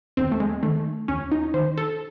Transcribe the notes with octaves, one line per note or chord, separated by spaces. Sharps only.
D#2 C4
A3
G#3
D#3 A3
D#2 C#4
D#4
D#3 C5
A4